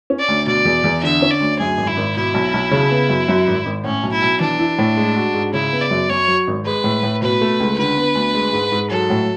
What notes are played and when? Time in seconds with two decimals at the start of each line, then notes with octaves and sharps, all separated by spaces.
0.10 C#4
0.19 D5
0.28 D2
0.47 B2 D5
0.65 E2
0.84 E2
1.03 D3 E5
1.22 C#4
1.31 D5
1.40 D2
1.59 F#2 G#4
1.78 G#1
1.87 E4
1.97 G#1
2.16 B2 E4
2.34 B1
2.54 B1
2.71 C#3
2.91 B3
3.09 F#2
3.28 F#2
3.48 G#1
3.66 G#1
3.84 A2 C#4
4.03 B1
4.12 E4
4.22 B1
4.40 E3 D4
4.59 E4
4.78 A2
4.97 G#3
5.16 F#4
5.34 G#2
5.53 C#3 E4
5.73 B3
5.82 D5
5.90 F#2
6.10 F#2 C#5
6.28 F#3
6.47 G#1
6.65 G#3 B4
6.84 A2
7.03 A2
7.22 B2 B4
7.41 A3
7.60 C#2
7.78 D3 B4
7.97 B3
8.15 D2
8.35 G#3
8.53 G#2
8.72 G#2
8.90 F#3 A4
9.10 A2